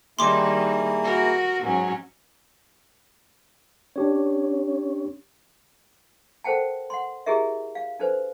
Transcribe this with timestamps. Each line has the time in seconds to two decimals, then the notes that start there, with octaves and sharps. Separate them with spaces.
0.19 D#3 G3 A#3 D#4 E4 G#4 C6 D6
1.04 F#4 A#4
1.62 G#2 F#3 C#4
3.96 C#4 D4 G4 C#5
6.44 A4 A#4 C5 F#5 G5 A5
6.90 F#5 C6
7.26 E4 G4 G#4 A#4 D#5 E5
7.75 F5
7.99 D4 A4 B4 C5